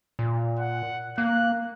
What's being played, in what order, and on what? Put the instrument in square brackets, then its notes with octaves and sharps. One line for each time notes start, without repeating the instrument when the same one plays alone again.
[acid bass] A#2
[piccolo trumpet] F#5
[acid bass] A#3 [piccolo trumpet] F#6